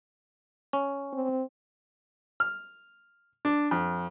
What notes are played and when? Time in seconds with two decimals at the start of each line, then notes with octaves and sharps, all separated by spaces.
0.73 C#4
1.13 C4
2.40 F6
3.45 D4
3.71 F2